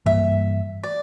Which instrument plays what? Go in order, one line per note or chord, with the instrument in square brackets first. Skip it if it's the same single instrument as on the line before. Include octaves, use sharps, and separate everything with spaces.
[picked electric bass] G2 E3 G3 A#3 [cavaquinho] E5
[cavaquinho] D5